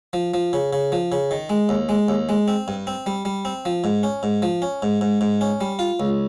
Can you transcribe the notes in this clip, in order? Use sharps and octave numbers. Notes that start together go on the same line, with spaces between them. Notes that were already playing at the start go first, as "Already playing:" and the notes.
F3
F3
C#3
C#3
F3
C#3
D#3
G#3
D#2
G#3
D#2
G#3
C4
G2
C4
G3
G3
C4
F3
G#2
C#4
G#2
F3
C#4
G#2
G#2
G#2
C#4
G3
F4
C#2